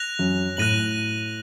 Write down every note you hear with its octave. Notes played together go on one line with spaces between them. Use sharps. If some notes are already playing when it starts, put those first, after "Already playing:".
Already playing: F#6 A#6 F7
F#2
A2 F#6 A#6 D#7 F#7